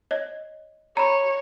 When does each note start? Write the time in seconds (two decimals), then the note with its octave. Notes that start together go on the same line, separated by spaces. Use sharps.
0.11 C#5 D#5
0.97 C#5 A#5 B5